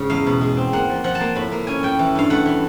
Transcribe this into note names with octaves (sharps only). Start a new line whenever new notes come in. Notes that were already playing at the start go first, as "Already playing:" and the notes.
Already playing: G#2 C#3
E2 F5
B2
G#3
C4
A#3 F#5
F3
F3 F#5
A5
A#3
A2 B5
A#3
C#4 G#5
A2 G5
E3
G2 F5
A3 F#5
E3